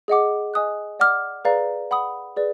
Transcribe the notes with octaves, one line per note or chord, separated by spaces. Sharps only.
G#4 D#5 F#5 D6
D#5 G#5 D#6 F#6
D5 F#5 D6 F6
G#4 B4 D5 F5 A#5
F#5 B5 D#6
G#4 B4 D5